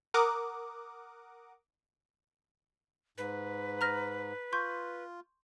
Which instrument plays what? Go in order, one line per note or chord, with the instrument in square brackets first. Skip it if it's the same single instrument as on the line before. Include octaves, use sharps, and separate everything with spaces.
[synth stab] A#4 F#5 D6 D#6
[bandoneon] G#2 [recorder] B4
[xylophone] A#5 F6 A#6
[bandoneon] F4 [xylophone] C6 C#6 G6